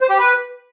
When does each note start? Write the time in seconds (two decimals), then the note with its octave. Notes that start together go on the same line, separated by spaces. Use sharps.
0.01 C5
0.10 G4
0.18 B4